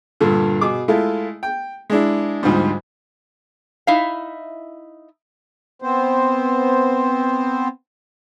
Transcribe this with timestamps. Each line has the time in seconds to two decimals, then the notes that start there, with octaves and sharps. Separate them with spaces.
0.21 G2 A#2 D3
0.61 B2 G#4 D6
0.88 G#3 A3 E4 F4
1.43 G5
1.90 G#3 D4 E4
2.43 D2 G#2 F3 G3
3.87 D#4 E4 E5 F5
5.82 B3 C4 C5